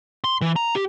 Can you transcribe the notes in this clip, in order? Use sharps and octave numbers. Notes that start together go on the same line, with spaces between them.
C6
E3
A#5
G4